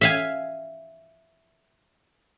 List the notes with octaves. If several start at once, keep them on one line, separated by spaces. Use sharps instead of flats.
E5 F5 G#5